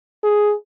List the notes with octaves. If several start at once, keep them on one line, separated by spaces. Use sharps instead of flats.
G#4